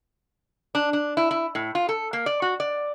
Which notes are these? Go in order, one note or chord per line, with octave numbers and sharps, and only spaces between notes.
D4
D4
E4
E4
A2
F4
A4
A#3
D5
F#4
D5